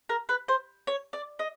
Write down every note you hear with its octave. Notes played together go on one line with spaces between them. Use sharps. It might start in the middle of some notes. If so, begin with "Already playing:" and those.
A#4
B4
C5
C#5
D5
D#5